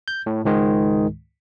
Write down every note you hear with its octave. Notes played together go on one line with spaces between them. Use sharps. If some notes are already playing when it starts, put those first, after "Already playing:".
G6
A2
C#2 G#2 D#3 G#3